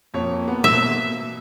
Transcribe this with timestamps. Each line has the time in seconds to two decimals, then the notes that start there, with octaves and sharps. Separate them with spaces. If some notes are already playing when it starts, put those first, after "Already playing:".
0.14 F2 A#3 C#5
0.48 B3
0.64 B2 E5